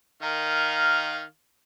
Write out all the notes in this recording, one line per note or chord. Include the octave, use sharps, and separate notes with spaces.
D#3 A#4 F5